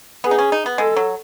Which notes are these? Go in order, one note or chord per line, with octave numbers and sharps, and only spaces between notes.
B3 G#4
D#4
C#4
D#4
B3
G#3 A4
F#3